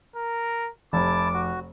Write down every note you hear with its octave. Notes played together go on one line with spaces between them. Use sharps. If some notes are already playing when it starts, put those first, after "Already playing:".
A#4
F1 E4 A5 D6
F#4